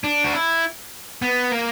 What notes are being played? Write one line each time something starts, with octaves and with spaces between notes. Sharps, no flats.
D4
F#4
E4
B3
A#3